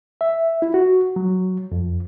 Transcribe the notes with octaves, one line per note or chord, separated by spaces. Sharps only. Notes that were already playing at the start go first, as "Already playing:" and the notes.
E5
E4
F#4
F#3
F2